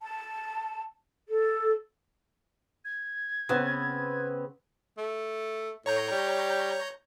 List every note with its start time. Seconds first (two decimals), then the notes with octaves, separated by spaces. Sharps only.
0.02 A5
1.27 A4
2.85 G#6
3.49 C#3 B3 C4 B4
4.98 A3
5.86 A2 C#5 A#5 G6
6.11 G3